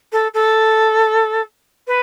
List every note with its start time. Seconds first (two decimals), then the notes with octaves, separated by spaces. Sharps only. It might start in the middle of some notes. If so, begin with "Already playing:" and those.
0.12 A4
0.34 A4
1.87 B4